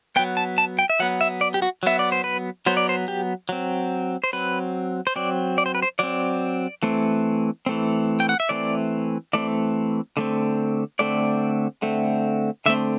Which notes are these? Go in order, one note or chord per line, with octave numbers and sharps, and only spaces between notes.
F#3 B3 G5
A5
A5
G5
E5
F#3 B3 F#5
E5
D5
G4
F#4
F#3 B3 E5
D5
C5
B4
F#3 B3 C5
D5
C5
G4
F#3 C4
C5
F#3 C4 B4
C5
F#3 C4 D5
D5
C5
B4
C5
F#3 C4 D5
E3 A3 C4
E3 A3 C4
G5
F#5
E5
E3 A3 C4 D5
E3 A3 C4 D5
D3 A3 C4
D3 A3 C4 D5
D3 A3 C4
D3 A3 C4 E5